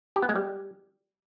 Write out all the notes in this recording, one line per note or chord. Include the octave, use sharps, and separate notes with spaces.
G4
B3
G#3
G3